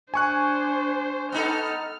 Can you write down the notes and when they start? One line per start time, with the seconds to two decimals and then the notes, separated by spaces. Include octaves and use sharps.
0.14 D4 C5 G#5 C#6 F#6
1.32 B3 D#4 A4 F6